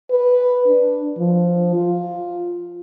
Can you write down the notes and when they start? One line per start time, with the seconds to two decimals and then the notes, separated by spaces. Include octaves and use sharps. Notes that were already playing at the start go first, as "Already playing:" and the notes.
0.11 B4
0.67 D4
1.18 F3
1.76 F4